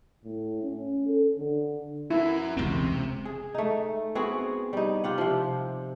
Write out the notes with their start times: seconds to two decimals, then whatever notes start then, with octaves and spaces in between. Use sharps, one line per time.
0.24 A2
0.63 C#4
1.07 A4
1.38 D3
2.10 E4 F#4 A#4
2.57 E1 C#2 C3 C4
3.25 G#4
3.54 A3 D#4
4.15 B3 C4 F#4 G#4
4.73 G3 D#4
5.04 F4 G4 F#5
5.18 C3 F3